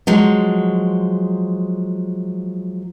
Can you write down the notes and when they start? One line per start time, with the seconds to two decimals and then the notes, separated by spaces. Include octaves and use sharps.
0.07 F3 F#3 G#3